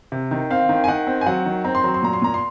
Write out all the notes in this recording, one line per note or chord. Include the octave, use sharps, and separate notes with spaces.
C3
D#3
C4 F5
D#3
G#5
D#3 F#5
C4
G#5
F#3 F#5
D#3
C4 A#5
C6
F#3 A#5
C6
A#2 A#5
C6
A#2 A#5
C6